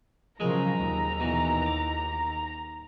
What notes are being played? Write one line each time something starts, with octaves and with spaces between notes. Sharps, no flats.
C#3 F3 F#3 G#3 G#4 A#4 A#5
D#2
B2 E3
D6